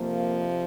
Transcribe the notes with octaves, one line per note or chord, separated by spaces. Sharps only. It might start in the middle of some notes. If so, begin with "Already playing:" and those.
Already playing: F2 C3 F3 A#3